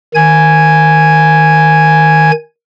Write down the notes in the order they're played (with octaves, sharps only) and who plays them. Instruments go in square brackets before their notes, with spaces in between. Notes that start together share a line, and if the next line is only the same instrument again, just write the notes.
[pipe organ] D#3 G#5 G#6